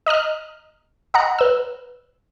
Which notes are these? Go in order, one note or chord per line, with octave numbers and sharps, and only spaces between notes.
D#5 A#5 D#6 F6
D#5 F#5 A#5 F#6
B4 E6